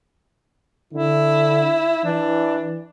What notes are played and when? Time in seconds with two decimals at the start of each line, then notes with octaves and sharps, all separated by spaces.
0.93 D3 E4
2.04 E3 D4